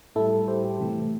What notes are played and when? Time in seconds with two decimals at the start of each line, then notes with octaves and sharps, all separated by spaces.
0.15 A2 G3 E4 A4
0.48 G4 C5
0.64 G4
0.80 C3 E3 A3